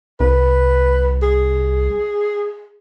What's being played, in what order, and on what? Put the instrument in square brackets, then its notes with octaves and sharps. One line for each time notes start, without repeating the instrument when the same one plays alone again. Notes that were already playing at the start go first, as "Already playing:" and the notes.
[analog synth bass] C2 [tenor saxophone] B4
[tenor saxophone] G#4